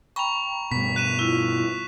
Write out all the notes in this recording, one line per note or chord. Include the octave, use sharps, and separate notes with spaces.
G5 A#5 B5 C#6 F7
G2 B2 B6
F#6 D#7 E7
E4 F4